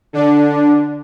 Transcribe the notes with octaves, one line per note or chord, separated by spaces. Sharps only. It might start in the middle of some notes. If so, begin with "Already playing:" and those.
D3 D4